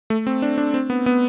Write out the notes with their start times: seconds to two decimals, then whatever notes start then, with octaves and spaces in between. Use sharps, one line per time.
0.10 A3
0.27 C4
0.42 D4
0.58 D4
0.74 C4
0.90 B3
1.06 B3